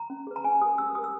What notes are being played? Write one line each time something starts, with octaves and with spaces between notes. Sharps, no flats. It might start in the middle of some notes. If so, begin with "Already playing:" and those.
Already playing: A#5
C#4
G#4 B4
A#5
C#4 G#5
G4 A#4 D#6
C#4 E6
G4 A#4 D#6
E6